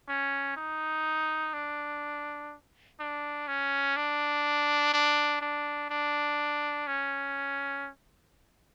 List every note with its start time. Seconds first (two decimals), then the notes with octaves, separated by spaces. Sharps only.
0.08 C#4
0.56 D#4
1.53 D4
3.00 D4
3.48 C#4
3.96 D4
4.93 D4
5.41 D4
5.90 D4
6.87 C#4